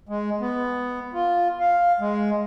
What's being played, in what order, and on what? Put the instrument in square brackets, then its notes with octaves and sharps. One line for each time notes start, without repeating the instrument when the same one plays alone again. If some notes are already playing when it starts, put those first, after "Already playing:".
[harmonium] G#3
B3
F4
F5
G#3